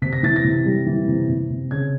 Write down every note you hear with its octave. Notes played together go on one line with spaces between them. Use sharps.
C3 B6
A#6
E3 A6
A#6
C3
G3
E3
C3
C3
C3
C#3 G#6